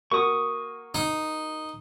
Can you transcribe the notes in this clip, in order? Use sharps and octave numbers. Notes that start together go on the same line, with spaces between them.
A#3 F#4 C#6 D#6
D#4